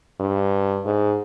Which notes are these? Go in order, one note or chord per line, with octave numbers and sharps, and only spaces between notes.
G2
G#2